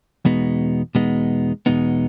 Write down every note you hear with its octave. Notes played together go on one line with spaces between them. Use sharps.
E2 B2 G#3 B3 D#4
E2 B2 G#3 B3 D#4
E2 B2 G#3 B3 D#4